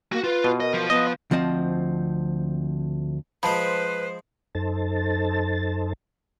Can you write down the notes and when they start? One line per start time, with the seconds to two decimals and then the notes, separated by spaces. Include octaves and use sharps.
0.12 A#3 F#4
0.24 F4 B4
0.44 B2
0.60 A#4 D#5
0.74 F3
0.90 B3 D#5
1.31 D2 F3 C4 D#5 A5
3.43 F3 G#3 B4 C5 A5 B5
4.55 F#2 D#4 A4 C5 A5 A6